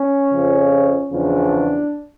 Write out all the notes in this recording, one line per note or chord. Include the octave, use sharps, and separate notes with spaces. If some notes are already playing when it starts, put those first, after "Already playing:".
Already playing: C#4
F2 C#3 F3
E2 C#3 F3 D4